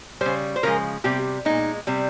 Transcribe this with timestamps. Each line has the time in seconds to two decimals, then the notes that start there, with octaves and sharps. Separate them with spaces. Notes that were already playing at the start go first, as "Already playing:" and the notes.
0.21 C#3 G3 C5
0.56 C5
0.63 C#3 F3 G#3 A#4
1.04 C3 G3 G4
1.45 A#2 G#3 D#4
1.87 C3 G3